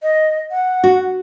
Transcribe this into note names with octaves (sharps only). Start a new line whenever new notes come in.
D#5
F#5
F#4